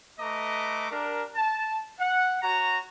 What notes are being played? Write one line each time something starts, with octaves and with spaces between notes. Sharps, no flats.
A3 B4 D#5 A#5 D6
D4 G4 A#4
A5
F#5
F#4 C#5 A#5